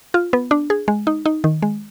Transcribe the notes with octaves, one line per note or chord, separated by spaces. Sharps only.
F4
B3
D4
G#4
G#3
D#4
D#4
D#3
G#3